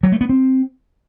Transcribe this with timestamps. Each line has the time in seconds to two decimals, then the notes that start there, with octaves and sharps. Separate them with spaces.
0.03 F#3
0.12 A3
0.21 B3
0.29 C4